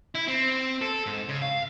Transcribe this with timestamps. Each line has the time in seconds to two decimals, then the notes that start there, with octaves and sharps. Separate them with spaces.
0.15 E4
0.27 C4
0.81 A4
1.06 G#2
1.29 C#3
1.42 F5